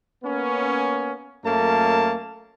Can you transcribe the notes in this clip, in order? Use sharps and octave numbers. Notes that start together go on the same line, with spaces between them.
A#3 B3 C#4
F#2 A3 A#3 C#4 A5